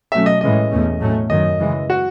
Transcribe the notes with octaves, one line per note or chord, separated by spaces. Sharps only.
B2 F#3 A3 C#4 E5
D#5
A2 E3 G#3 C#4 D#5
E2 B2 A3 C#4
A2 F#3 A3 C#4
F#2 D#3 F#3 D#5
C#3 E3 G#3
F#4